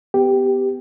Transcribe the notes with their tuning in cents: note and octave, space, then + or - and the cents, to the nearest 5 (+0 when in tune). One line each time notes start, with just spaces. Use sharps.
B3 +20 G4 +0